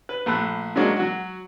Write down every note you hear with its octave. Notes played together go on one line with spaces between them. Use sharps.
B4
A#1 A3 B5 F#6
F#3 G#3 A#3 C#4 D4 F#4
F#3 F#4